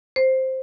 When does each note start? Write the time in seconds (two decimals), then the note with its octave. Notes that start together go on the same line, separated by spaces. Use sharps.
0.16 C5